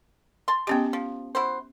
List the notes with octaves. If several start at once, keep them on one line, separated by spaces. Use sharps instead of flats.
A5 C6
G#3 B3 C#4 D#4 G4 G5
F3
E4 F#4 C5